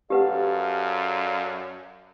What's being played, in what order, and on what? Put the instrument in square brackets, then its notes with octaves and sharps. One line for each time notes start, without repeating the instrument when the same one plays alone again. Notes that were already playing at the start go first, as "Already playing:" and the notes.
[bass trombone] F#2 [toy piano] G4 B4 F#5 [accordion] A4 D5 F5